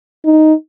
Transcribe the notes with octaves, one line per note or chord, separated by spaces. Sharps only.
D#4